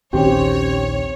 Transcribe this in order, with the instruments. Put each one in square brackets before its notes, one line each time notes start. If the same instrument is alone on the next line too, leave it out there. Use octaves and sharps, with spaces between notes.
[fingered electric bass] A#1 D#2 D#3 [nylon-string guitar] C4 [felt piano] C#4 G4 [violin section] C#5